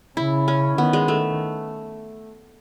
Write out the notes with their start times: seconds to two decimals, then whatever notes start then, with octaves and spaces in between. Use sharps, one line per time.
0.17 C#3 E4
0.48 C#4
0.77 D#3 B3
0.93 G#3
1.08 A3